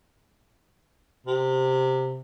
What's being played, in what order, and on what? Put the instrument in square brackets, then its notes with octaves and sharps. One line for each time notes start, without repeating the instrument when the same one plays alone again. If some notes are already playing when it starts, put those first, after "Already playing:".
[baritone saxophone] C3